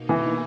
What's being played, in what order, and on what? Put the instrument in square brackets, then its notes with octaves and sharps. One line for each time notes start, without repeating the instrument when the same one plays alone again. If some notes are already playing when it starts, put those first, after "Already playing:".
Already playing: [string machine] B2 A#3 D#4
[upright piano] E3